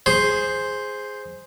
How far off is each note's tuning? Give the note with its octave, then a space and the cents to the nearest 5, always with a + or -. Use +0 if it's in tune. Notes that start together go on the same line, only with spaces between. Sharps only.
G#4 +0 C5 +0